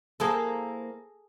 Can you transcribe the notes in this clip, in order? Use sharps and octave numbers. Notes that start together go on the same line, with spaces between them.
A#3 E4 G#4 A4 C5